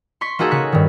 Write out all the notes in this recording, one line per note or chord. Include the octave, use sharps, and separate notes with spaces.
C6 C#6 B6
A#3 D#4 F#4 G#4 A4
C#3 C#6 F#6 B6
G2 D#3